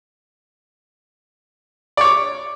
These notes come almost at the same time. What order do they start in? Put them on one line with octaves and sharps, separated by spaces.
D5 C#5 D6